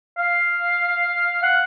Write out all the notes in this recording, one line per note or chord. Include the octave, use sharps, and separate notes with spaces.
F5
F#5